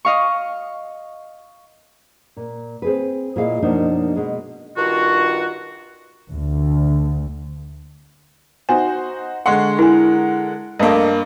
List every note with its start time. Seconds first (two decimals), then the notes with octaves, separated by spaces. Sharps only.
0.05 D#5 F5 C#6
2.37 A#2
2.82 C4 G#4 B4
3.36 A#2 E4 G#4 D#5 F5
3.63 F#2 B2 F3 A#3 D4 D#4
4.15 B2 G#3
4.77 G2 D#3 F4 F#4
6.32 D2
8.69 D#4 F#4 C5 G#5
9.46 D3 G#3 F#5 C6 C#6
9.79 E4 A#4 G#5
10.79 G2 A3 A#3 A#4 D#5